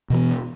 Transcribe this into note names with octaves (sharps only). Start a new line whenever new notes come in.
B2 E3 B3